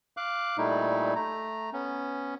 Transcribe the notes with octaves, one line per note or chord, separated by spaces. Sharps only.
F5 D6 F#6
A#2 G3 A3 D#4 E4
A3 A#5
B3 C#4